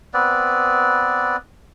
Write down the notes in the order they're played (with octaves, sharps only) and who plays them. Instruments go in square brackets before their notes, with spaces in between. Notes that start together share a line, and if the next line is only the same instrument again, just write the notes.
[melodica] B3 C4 B4 D5